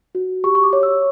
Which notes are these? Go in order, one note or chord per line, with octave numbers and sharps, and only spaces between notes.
F#4
G4 C#6
C#6
D6
C#5
E6